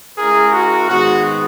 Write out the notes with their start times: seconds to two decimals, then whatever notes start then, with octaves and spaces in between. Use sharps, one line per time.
0.17 G#3 C#4 E4 G#4 A#4
0.53 F#4
0.89 G#2 D#3 G#3 B3 F#4